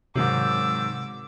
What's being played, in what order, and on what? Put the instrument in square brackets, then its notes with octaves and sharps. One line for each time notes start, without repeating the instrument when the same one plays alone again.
[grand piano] G#2 D#3 F#3 [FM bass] C3 [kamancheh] D6 E6